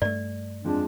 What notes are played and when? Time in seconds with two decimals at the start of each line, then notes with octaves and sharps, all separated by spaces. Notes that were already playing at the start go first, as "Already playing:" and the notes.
0.02 G2 A3 D5
0.65 F2 F3 G#3 D4